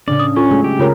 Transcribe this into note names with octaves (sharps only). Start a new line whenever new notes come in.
A2 C#3 D4 D5
D#6
C#4 F4 A4 C#6
F#3 G#3 A3 G#4
G4
C#3 G#3 F4 A#4 C#5 B5